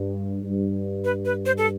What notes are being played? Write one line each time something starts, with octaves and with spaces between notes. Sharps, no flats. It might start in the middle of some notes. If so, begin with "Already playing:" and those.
Already playing: G2
G2
B4
B4
C5
A4